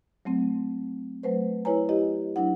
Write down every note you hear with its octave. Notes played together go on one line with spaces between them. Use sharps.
F#3 A3 C4
F#3 A3 B4 C5
E4 B4 C#5 G#5 A#5
E4 G4 D#5
F#3 D4 E4 F#5